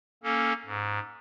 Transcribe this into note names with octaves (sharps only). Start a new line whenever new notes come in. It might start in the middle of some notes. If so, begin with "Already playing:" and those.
A#3 C#4 A4
G#2